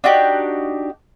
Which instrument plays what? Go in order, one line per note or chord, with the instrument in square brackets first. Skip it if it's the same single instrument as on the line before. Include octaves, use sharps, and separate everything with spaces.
[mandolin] D4 D#4 F#4 G4